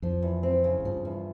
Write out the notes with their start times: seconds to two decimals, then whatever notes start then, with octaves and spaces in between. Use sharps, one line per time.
0.02 F2 F3
0.23 E2
0.43 C4
0.64 C#3
0.80 F2
0.85 G2 F3
1.05 E2